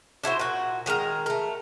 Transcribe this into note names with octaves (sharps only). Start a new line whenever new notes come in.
D4 E4 F#4 C5
A#2 F#4
D#3 G#3 G#4 A#4
A3 A#4